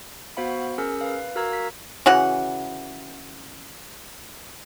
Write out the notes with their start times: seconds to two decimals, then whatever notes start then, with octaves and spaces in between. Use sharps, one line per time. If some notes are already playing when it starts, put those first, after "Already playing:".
0.37 B3 F#4 C5 F5 F#5 B5
0.78 C#4 G#4 A#4 E6
1.01 B4 F5
1.36 F#4 A#4 F5 A#5 E6 G#6
1.53 B6
2.06 C#3 E3 F#4 F#5